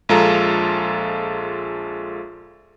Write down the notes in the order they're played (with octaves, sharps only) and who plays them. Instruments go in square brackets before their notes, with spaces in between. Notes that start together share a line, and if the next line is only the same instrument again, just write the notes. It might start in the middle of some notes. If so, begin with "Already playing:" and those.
[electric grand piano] A#1 G#3 F4 A4 A#5